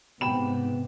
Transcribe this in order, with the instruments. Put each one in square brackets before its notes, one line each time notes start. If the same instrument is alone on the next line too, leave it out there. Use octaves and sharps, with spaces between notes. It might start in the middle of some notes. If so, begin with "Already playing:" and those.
[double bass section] G#2 C3 [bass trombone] B3 [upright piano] G5 B5 E7